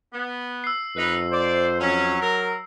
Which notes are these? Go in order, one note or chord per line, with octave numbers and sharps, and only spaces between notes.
B3
E6 C7
F2 D#4 B4
C5 D5
F#3 C#4
A#4